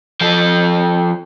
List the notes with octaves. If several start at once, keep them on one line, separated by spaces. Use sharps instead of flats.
F3 A4